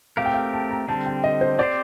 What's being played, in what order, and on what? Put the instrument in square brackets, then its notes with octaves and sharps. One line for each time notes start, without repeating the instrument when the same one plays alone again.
[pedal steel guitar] A3 C4 G4 A#4 [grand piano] F5
[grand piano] G5
F5
A5
A#5
[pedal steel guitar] D3 G3 C4 [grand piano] A5
[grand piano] G5
D#5
C5
[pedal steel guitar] C4 G4 C5 [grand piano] D5